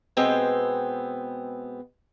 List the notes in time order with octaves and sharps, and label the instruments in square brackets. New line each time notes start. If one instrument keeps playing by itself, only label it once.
[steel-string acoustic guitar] B2 G#3 B3 C4 G5 G#5